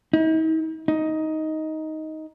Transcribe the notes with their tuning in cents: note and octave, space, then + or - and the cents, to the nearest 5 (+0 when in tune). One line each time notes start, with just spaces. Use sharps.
D#4 +45
D#4 +10